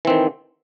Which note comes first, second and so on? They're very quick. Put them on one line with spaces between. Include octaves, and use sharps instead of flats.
E3 C4 D#3